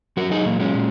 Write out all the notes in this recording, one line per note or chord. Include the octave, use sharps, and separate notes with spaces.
F#3 F#4 A#4
D#4 G#4
A#2 A#3
G#3 C#4
A#2